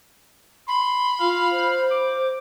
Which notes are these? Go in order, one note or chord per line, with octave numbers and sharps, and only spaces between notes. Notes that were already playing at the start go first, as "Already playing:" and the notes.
B5 C6
F4 F5
C5
D6